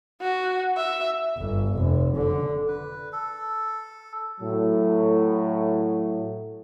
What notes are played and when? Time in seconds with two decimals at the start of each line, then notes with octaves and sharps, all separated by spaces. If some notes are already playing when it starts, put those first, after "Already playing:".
0.21 F#4
0.77 E5
1.37 G1
1.74 F1
2.15 D3
2.68 B4
3.13 A4
4.41 A2 F#3